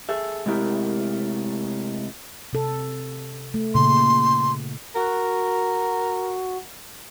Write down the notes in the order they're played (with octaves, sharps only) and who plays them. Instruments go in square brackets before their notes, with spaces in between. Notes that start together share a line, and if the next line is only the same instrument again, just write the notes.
[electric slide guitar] G#4 A4 E5
C3 G#3 A3 E4 G4 A#4
[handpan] C3 A4
A3
[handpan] A#2 C#3 [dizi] C6
[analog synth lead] F#4 [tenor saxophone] A#4